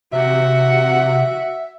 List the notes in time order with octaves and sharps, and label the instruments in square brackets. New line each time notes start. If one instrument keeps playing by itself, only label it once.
[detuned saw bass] C3 [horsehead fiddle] F#4 F#5 [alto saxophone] E5